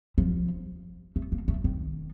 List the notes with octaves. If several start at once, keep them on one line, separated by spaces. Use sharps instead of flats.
F3
A3
A#3
A3
D#3